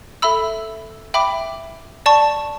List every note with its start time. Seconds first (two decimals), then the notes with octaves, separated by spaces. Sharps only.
0.22 A4 E5 B5 E6
1.14 E5 G5 B5 D6
2.06 D5 A5 C#6